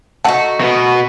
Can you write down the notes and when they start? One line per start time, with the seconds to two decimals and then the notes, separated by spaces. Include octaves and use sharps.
0.24 A3 D#4 F#4 F#5 A5
0.60 B2 B3